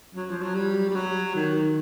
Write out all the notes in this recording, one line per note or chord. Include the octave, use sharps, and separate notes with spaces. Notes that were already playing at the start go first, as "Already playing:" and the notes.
F#3
F3
F#3
G3
G3
F#3
D#3